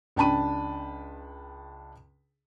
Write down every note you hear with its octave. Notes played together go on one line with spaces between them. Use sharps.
C#2 D4 G5 A5 B5 D#7